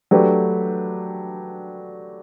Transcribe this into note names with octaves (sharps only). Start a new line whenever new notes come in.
F#3 A3 D4 G4 B4